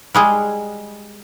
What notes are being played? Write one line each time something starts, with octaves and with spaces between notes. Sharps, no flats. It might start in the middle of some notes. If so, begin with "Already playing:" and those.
G3 G#3 G#4